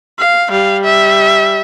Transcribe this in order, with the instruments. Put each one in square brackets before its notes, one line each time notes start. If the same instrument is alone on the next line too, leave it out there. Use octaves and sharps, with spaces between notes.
[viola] F5
[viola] G3 [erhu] F5
[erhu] E5